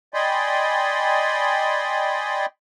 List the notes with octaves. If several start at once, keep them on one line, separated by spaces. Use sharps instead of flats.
D5 D#5 G5 G#5 B5 C6